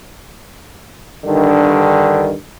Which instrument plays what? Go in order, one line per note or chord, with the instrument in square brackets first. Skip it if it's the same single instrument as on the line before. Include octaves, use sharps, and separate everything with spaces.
[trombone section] G2 D3 D#3